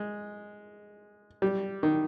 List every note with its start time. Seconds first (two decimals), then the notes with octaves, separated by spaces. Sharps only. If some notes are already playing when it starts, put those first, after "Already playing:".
Already playing: G#3
1.42 G3
1.83 D#3